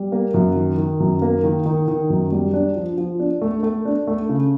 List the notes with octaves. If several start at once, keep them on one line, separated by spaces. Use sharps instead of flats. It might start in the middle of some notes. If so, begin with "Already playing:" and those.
Already playing: G3
A#3
F#2
D#3
D#3
F#2
A#3
D#3
D#3
D#3
F#2
G3
D4
F3
F3
D4
A3
A3
D4
A3
C#3